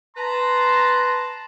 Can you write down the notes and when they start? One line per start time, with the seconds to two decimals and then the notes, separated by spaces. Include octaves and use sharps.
0.16 B4 A5 A#5 C6